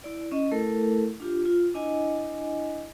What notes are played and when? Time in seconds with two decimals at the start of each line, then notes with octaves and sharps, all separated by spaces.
0.04 E4 D5
0.31 C#4 D#5
0.52 A3 E4 A4 A#4
1.20 D4 F4 G4
1.45 F4
1.74 D4 E4 D#5 G#5